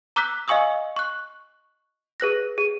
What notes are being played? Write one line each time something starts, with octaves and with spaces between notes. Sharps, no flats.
A#5 D6 E6 F#6 G6 B6
D#5 F5 G#5 C#6 D#6 E6
C#6 F#6
G#4 B4 F#6 A#6
G#4